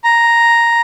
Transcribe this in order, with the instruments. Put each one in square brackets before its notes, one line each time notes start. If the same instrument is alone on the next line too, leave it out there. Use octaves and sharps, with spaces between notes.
[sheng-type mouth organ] A#5